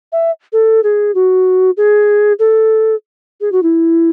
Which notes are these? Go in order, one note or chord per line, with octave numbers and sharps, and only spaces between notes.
E5
A4
G#4
F#4
G#4
A4
G#4
F#4
E4